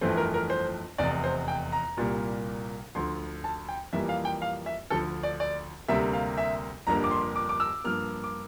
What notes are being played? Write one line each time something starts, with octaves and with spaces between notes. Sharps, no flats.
G1 F2 E3 A3 C5
A#4
A#4
C5
F1 E2 C3 D5
C5
G5
A#5
C2 A#2 G3 A#3
D2 D3 F3 C6
A5
G5
F2 E3 G3 A#3 E5
F5
G5
F5
E5
D2 D3 F3 A4
D5
D5
D2 C3 G3 A#3 E5
F5
E5
G1 F2 D3 G3 A#3 A#5
D6
C6
D6
D6
E6
G2 F3 A#3 F6
D6